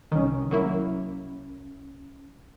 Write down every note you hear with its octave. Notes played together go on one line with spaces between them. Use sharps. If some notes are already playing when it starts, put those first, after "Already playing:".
C2 D#3 C#4
F#3 A#3 E4